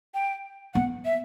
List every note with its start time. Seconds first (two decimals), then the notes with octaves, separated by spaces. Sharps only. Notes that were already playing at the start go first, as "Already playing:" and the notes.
0.14 G5
0.74 B3 F#5
1.05 E5